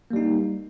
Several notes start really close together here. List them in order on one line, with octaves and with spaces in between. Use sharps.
A#3 G3 D#4